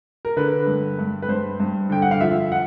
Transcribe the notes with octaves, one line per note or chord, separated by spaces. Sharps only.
A#4
D3 B4
G2
G2
B4
G2 C5
G2
D3 G5
F#5
F5
F3 E5
F#5